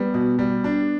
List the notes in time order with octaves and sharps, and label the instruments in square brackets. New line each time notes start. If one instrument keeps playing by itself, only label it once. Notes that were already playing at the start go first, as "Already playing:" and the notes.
Already playing: [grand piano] G3 [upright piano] B3
[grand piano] B2
G3
D4